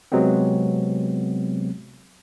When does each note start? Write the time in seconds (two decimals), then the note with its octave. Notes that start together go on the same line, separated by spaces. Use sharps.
0.12 C3 F#3 G#3 B3 C4